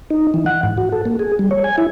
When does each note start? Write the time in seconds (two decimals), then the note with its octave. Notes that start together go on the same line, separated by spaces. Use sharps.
0.10 D#4
0.34 E3
0.46 F#5
0.63 G#2
0.78 F#4
0.92 A4
1.05 A#3
1.19 G#4
1.39 G3
1.51 C#5
1.64 G#5
1.78 E4